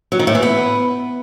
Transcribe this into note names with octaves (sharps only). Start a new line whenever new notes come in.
F#3
D#3
A2
E3
B3